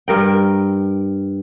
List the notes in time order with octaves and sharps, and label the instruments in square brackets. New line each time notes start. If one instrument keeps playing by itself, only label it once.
[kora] G2 A#4 G5